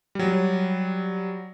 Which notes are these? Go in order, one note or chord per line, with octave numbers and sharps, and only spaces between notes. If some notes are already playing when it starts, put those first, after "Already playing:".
F#3 G3